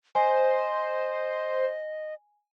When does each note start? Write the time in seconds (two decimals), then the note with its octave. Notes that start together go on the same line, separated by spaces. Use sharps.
0.15 C5 D#5 G#5